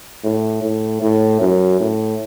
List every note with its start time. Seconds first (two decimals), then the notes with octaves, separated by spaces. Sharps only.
0.24 A2
0.63 A2
1.02 A2
1.41 F#2
1.80 A2